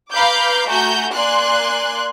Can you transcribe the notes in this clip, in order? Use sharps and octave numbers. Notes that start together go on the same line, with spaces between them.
B4 F5 A#5 B5 D6 G6
A3 F#4 G#5 A#5 G6
A#3 D5 G#5 C6 F#6